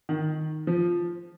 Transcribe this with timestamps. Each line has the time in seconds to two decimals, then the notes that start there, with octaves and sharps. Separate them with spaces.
0.09 D#3
0.67 F3